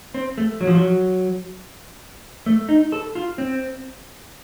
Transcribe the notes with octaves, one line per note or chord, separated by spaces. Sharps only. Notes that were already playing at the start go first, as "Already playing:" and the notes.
C4
A3
F#3
F3
F#3
A3
D#4
A4
F4
C4